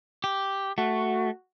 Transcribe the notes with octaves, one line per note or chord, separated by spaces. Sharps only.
G4
A3 F#4